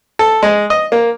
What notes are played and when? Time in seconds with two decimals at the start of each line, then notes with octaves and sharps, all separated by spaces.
0.19 A4
0.43 G#3
0.70 D#5
0.92 A#3